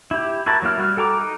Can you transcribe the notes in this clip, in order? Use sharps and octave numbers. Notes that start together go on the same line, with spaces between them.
E4 G4
E4 F#4 A#4 A5
F#3 A#3 E4 F6
G3 F#4 F6
A4 G5 A#5 D6
D#4